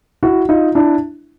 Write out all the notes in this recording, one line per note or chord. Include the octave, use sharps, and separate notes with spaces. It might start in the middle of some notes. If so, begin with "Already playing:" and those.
E4 F#4
D#4 F4
D4 E4